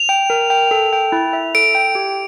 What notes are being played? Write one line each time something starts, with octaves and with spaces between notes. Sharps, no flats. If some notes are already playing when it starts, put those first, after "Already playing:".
Already playing: F7
G5
A#4
G5
A4
G5
E4
E5
A4 D7
G5
G4